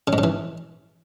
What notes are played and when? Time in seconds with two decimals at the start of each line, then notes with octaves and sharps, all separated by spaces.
0.07 C#3
0.13 G#2
0.18 C#3
0.24 E3